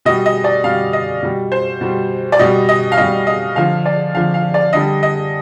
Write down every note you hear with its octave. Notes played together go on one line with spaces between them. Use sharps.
B2 G3 D#5
D#5
D5
B2 G3 F5
D#5
B2 G3
C5
B2 G3
D5
B2 G3 D#5
D#5
F5
B2 G3 D#5
D#5
D3 F3 F5
D5
D3 F3 F5
F5
D5
D3 G3 D#5
D#5